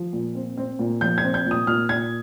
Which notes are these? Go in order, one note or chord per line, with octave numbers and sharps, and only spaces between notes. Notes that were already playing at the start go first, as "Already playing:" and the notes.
Already playing: F3
A#2
C4
C4
A#2
F3 G6
G#6
C4
G6
A#2
D#6
A#2 F6
A#2 G#6